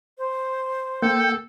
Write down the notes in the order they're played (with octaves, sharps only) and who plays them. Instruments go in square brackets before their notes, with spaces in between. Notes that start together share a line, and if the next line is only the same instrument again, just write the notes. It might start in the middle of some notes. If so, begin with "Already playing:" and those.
[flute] C5
[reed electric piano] A#3 [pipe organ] A4 [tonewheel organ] G5